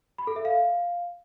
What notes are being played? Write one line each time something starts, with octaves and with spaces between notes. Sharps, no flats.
B5
A4
E5
F5